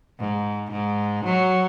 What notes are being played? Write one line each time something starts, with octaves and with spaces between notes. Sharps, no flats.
G#2
G#2
F#3